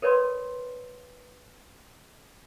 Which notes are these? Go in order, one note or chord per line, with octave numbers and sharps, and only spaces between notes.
A#4 B4 C#5 D5 B5 C6